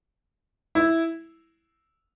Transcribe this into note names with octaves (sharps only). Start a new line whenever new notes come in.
E4